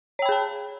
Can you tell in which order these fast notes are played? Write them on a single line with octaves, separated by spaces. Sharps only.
C#5 G5 B5 G#4 A5